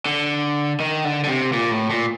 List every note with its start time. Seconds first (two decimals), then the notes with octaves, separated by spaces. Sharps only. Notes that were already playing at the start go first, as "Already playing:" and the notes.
0.06 D3
0.80 D#3
1.05 D3
1.24 D3
1.28 C3
1.53 A#2
1.71 A2
1.90 A#2